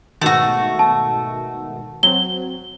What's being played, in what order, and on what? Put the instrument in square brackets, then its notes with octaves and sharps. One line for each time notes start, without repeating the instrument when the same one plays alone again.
[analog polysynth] G#2 B2 D#3 [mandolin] A3 F#4
[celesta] A5
[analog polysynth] F#3 C4 [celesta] G7